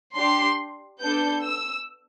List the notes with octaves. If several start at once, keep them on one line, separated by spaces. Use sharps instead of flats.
D4 G4 C6
B3 D4 A4 G6
E6